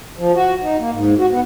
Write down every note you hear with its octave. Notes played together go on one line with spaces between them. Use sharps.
F3
F#4
D#4
A#3
G#2
F#4
B3